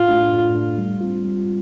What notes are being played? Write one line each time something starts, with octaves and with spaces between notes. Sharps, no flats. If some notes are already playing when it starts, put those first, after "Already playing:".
Already playing: A2 F4
A3 D4
A2
A3 D4
G3
C4 F4
G3